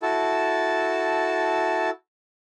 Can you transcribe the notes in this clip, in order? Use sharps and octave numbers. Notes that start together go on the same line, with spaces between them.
E4 F#4 A4 A5